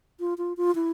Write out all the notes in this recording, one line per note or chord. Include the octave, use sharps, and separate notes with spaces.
F4
F4
F4
E4